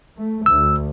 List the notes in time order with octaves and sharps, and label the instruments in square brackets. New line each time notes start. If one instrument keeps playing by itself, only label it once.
[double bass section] A3
[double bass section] D2 [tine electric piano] E6